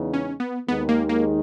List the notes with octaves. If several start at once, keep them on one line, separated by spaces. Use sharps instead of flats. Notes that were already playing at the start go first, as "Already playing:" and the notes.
Already playing: E2 C#3 G#3 B3 D#4
C#4
B3
D#2 D#3 G#3 B3 D#4
A#3
A#3